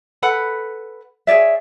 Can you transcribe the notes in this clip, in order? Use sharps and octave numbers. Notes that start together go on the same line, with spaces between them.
A4 B4 F#5 B5
G#4 C#5 D5 E5